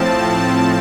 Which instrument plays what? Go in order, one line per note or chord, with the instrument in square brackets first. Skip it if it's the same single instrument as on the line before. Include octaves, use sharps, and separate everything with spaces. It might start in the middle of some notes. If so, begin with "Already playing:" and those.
Already playing: [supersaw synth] A2 F3 C4 A5